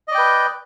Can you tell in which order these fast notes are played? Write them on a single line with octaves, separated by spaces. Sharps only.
D#5 D5 G5 B4